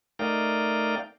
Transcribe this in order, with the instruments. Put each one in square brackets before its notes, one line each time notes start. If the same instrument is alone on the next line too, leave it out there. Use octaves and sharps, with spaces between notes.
[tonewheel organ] A3 D#4 A#4 D5 F5 G5